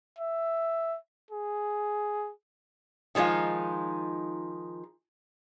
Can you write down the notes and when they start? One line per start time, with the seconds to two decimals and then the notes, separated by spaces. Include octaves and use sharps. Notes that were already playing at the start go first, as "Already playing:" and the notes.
0.19 E5
1.31 G#4
3.15 D#3 F3 G#3 D#4 F4